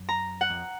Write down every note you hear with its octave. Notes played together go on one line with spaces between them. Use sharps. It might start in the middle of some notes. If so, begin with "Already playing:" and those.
Already playing: F#2
A#5
F#5
F2